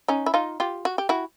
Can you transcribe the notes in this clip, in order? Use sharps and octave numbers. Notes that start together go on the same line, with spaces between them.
C#4 D#4
E4
D#4 F4
F4 G4
F#4
G4
E4 F#4